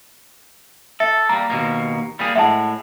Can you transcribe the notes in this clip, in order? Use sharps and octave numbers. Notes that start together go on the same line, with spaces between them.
A4 E5
G3 A#3 A#5
D#2 B2 A#3
G3 A#3 G#4
A2 G#3 E5 F#5 A5